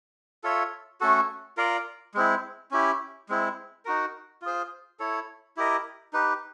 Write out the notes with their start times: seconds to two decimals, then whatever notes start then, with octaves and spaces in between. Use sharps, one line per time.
0.44 F4 A4 C#5 E5
1.01 A3 C#4 F#4 A4
1.57 F4 A#4 D5 F5
2.14 G#3 C4 E4
2.71 C#4 E4 G4
3.29 G#3 C4 E4
3.85 D#4 F#4 A#4
4.42 F4 G#4 C5
4.99 E4 A4 C#5
5.57 E4 G4 A#4 D#5
6.13 D#4 G4 B4